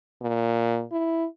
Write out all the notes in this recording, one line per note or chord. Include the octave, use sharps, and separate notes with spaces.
A#2
E4